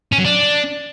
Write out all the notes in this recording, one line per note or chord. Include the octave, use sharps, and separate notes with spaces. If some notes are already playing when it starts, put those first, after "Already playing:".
C#4
F#3
D4